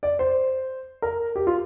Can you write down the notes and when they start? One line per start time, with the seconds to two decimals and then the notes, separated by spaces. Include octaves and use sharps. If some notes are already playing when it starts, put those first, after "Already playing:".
0.03 D5
0.19 C5
1.02 A#4
1.36 G4
1.47 F4